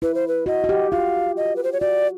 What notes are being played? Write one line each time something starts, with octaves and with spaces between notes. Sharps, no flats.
E4 B4
C5
B4
F#4 D#5
F#4
G4
F4 F5
D#5
B4
C5
C#5
F#4 D5